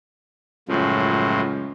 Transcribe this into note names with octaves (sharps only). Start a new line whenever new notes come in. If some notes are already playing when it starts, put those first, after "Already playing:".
C#2 F#2 A2 F3